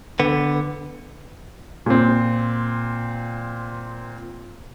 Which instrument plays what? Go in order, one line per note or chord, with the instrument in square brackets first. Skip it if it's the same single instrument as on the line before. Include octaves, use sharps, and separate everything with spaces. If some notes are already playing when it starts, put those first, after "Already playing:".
[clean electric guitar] D3 B3
[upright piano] A#2 C4